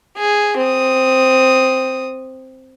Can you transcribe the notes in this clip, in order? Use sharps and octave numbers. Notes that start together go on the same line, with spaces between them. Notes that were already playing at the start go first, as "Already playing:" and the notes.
G#4
C4 D#6